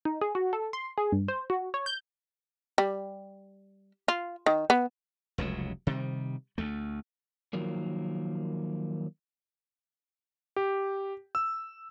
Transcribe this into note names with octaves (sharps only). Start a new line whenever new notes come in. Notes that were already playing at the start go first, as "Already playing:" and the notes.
D#4
G#4
F#4
A4
C6
G#4
G2
C5
F#4
C#5
G6
G3
F4
D#3
B3
F1 C#2 C#3 F#3
C3 D#3 F3 G3
D2 A3
D#3 F3 F#3 A#3
G4
E6